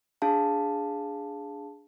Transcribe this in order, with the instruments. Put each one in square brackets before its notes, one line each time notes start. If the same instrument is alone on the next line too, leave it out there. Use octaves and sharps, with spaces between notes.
[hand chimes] D4 G#4 F5 A5